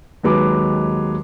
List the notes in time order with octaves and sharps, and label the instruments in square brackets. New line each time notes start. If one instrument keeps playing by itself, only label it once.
[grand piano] D#2 D#3 F#3 G#3 B4 D6